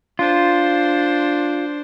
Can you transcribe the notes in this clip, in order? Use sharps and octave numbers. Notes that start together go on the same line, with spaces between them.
D4 F4 C5